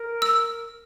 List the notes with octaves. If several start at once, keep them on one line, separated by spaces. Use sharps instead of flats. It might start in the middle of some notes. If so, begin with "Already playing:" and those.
Already playing: A#4
E6